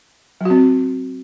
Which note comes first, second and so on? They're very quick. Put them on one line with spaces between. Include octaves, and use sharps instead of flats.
F#3 F#4 C4